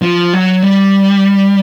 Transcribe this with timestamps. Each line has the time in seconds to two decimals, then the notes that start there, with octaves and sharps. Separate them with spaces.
0.02 F3
0.33 F#3
0.63 G3